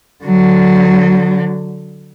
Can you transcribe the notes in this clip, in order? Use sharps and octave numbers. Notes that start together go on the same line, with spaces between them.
D3 F#3